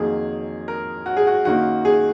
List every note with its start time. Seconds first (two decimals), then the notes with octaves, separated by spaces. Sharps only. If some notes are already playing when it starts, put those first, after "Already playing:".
Already playing: F2 D#3 F#3 A#3 G#4
0.68 A#4
1.06 F#4
1.17 G#4
1.27 F#4
1.45 F#2 D#3 A#3 F#4
1.85 G#4